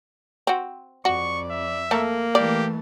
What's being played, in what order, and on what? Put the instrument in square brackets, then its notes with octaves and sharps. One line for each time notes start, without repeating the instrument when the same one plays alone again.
[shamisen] C4 F#4
[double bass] F2 [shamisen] F#4 [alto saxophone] D5 [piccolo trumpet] C#6
[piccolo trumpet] E5
[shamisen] A3 A4 A#4 [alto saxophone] A#3
[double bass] E3 A3 [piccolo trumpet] G4 [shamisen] D5